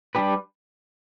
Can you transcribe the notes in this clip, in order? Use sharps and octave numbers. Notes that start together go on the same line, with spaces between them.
G3 D4 G4 B4